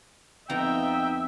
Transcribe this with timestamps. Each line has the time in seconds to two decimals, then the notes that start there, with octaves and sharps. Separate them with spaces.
0.50 F2 B3 D#4 E5 G5 A#5